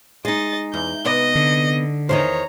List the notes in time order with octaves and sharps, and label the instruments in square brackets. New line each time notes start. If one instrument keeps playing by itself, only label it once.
[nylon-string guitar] G#3 D#4 [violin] D#5 A6
[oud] E2 [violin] G6
[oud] C3 B3 D5 [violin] D#5
[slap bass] D3
[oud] E2 D#3 [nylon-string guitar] C5 D#5 [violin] C#5 A#5